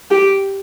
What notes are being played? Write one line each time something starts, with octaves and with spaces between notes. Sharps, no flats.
G4